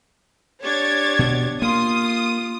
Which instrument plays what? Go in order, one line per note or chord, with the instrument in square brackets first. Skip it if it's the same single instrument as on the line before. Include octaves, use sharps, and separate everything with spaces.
[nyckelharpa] D4 G4 [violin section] C#5 G#6 A6
[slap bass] B2
[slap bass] A#3 [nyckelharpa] F4 C6 [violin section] D#6